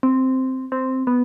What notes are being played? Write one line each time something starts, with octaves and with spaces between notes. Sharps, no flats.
C4
C4
B3